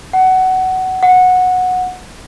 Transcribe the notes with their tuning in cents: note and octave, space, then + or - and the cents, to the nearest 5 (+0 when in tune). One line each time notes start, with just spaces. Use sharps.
F#5 +20
F#5 -15